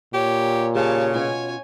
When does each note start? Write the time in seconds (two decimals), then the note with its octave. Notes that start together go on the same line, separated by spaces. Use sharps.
0.14 A#2 G4 C#5
0.75 C#3 G4 G#4 C#5 F5 A5
1.14 B2 C#4 F4 C#5 G#5